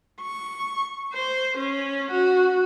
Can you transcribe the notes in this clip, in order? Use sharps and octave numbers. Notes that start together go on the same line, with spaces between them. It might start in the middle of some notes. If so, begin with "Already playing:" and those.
C#6
C5
C#4
F#4